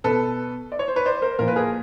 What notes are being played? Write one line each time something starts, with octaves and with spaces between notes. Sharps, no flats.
B2 A4 B4
D5
C#5
C5
B4 C#5
C5 D5
A#4 C5
A#2 F3 A#4
B4
G#4 A#4